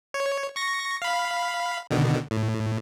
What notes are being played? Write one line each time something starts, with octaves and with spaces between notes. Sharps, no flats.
C#5
C#6 A#6
F5 B5
B2 D3 D#3
A2